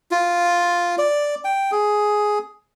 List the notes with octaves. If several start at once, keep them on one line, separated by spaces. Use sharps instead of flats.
F4
D5
G5
G#4